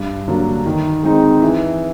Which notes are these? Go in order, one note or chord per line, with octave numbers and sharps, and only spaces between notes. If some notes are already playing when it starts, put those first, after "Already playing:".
Already playing: G2
D3 F#3 A#3 D4
D#3
G#3 C4 D#4
E3